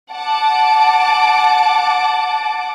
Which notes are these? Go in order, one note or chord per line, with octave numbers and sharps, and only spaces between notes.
F#5 A5 D6